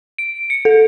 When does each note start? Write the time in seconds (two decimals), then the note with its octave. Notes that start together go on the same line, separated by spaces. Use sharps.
0.18 D7
0.50 C#7
0.65 A4